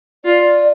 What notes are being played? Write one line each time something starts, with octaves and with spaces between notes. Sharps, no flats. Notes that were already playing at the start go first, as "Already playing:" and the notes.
F4 D5